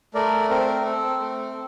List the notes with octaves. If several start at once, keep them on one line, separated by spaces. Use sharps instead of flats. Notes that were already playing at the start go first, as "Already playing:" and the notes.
A3 A#4 D5
C4 A#4
C5
A#4
C4 A4
A3